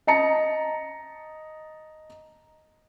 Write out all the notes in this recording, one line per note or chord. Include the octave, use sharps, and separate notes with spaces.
D#5 A5 A#5 C#7